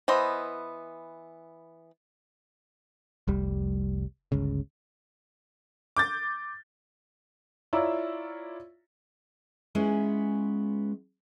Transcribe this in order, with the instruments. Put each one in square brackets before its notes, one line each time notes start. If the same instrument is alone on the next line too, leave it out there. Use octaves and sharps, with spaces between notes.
[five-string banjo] E3 B3 C5 D#5
[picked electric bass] F1 C2 G3
G1 C#2 C#3
[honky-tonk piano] D6 G6 A6
[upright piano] E4 F4 C#5 D5 A#5 E6
[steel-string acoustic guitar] G#3 B3 C#4 E4 F4